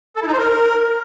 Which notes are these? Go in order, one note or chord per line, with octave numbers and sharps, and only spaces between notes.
A4
E4
D#4
C5
A#4